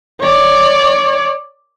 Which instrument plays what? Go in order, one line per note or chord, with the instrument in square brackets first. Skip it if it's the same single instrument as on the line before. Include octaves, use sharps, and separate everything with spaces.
[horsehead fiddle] C#5 D5